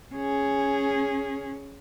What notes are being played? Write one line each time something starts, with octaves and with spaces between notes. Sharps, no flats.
C#4 G#4